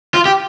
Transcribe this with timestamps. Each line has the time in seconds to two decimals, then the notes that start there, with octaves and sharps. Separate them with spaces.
0.14 F4
0.26 G4